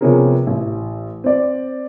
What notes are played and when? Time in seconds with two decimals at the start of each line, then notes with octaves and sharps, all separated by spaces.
0.01 C3 F3 B3 C#4 G#4 A#4
0.47 A1
1.24 C4 D5